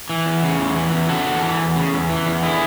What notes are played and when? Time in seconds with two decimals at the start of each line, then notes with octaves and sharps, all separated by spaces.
0.09 E3
0.26 E2
0.43 C#3
0.59 E2
0.76 E3
0.92 E2
1.09 C#3 F#4 A4
1.26 E2
1.43 E3
1.60 E2
1.76 C#3
1.93 E2
2.10 E3
2.26 E2
2.43 D3 E4 G#4